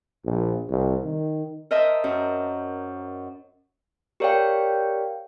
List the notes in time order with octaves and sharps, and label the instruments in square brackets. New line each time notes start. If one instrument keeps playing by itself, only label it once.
[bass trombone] A#1
C2
D#3
[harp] A#4 C5 D#5 E5 A5
F#2
[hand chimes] G4 A#4 C#5 D5 F5 G5